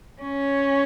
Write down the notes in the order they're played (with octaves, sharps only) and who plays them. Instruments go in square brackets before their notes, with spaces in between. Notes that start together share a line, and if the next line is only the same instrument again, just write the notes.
[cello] C#4 [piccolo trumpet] C#5